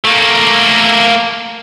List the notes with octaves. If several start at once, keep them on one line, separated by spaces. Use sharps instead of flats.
A3 A#3